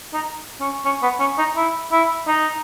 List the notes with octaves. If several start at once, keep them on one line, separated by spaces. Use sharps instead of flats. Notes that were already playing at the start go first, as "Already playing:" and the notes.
D#4
C#4
C#4
B3
C#4
D#4
E4
E4
D#4